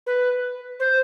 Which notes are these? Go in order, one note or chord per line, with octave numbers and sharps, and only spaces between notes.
B4
C5